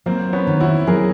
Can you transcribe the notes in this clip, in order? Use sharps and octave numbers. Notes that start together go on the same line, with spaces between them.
F#3 A#3 C4
B3 C#4
D#3
E4 F#4
F#3 G#4 A#4